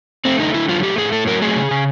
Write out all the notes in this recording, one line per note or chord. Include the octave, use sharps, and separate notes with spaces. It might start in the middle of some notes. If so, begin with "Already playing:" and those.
A3 C4
D3 D#4
D3 E4
F#3 F4
A3 G4
A2 G#4
A2 A4
F#3 A#4
A3 G#4
C#3
C#3